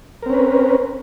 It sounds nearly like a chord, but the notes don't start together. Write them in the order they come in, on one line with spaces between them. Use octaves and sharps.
A#4 C4 C#4 B4